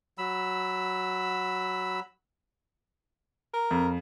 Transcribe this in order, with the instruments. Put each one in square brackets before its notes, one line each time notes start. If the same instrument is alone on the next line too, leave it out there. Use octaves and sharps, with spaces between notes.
[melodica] F#3 B5 E6
[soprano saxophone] A#4
[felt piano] F2